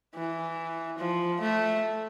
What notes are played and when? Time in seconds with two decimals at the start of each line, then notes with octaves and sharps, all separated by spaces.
0.15 E3
0.98 F3
1.41 A3